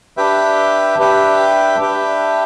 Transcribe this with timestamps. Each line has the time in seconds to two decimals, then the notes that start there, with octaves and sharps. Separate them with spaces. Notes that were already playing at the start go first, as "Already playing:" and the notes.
0.17 D4 G4 B4 E5 G5
0.99 D4 G4 B4 E5 G5
1.79 D4 G4 B4 E5 G5